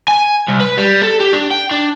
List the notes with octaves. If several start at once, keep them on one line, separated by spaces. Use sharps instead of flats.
G#5
C2
B4
G3
A4
G4
D4
G5
D4